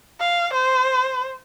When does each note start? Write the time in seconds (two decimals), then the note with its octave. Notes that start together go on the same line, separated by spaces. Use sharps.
0.20 F5
0.54 C5